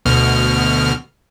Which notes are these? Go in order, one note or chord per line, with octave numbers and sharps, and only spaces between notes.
D2 B2 F6